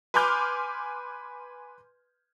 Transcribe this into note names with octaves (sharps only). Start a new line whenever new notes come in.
B4 G#5 C6 D6 F6 G6